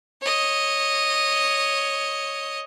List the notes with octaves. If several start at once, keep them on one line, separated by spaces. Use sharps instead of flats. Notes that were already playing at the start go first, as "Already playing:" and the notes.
C#5 D#5